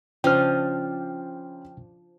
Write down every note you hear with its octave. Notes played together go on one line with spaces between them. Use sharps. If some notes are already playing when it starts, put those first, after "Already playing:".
C#3 F3 D4 C5 D#5 G5 F6